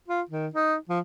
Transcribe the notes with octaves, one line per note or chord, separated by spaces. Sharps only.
F4
D#3
D#4
F3